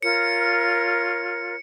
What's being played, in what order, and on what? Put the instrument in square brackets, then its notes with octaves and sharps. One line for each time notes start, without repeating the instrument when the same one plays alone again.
[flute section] F4 A#4 C#5 [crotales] C#7